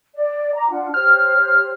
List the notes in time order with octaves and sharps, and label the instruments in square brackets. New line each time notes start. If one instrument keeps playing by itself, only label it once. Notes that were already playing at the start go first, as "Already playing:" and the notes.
[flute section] D5
A#5 D6
D4 F4 F#5
[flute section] G4 C5 C#5 [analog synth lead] F6